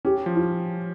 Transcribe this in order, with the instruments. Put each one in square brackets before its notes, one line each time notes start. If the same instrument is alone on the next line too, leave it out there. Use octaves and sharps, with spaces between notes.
[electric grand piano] C#4 [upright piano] G4
[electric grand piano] F3
[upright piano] F4